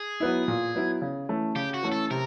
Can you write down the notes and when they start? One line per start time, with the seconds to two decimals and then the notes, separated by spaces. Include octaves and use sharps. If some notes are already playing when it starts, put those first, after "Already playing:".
Already playing: G#4
0.20 F#3 B3 E4
0.48 A#2
0.75 F#3 B3 E4
1.02 C#3
1.29 E3 A3 C#4
1.55 C#3 G4
1.74 F#4
1.83 E3 A3 C#4
1.92 A4
2.11 C3 A#4